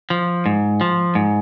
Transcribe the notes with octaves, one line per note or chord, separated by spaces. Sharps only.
F3
G#2
F3
G#2